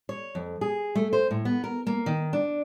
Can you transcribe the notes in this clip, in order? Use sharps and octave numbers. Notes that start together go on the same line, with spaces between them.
C#5
F2
G#4
A3
C5
A2
B3
A#4
A#3
D#3
D4